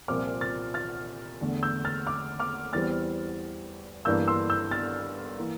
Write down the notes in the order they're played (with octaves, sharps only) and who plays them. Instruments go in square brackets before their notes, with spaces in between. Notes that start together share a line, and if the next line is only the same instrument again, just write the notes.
[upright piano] C2 A#2 F3 C4 D6 F6
F6 A6
F6 A6
E2 D3 A3
E6 G6
F6 A6
D6 F6
D6 F6
E2 E3 G3 C4 F6 A6
G1 G2 E3 A#3 D4 E6 G6
C6 E6
E6 G6
F6 A6
E3 A#3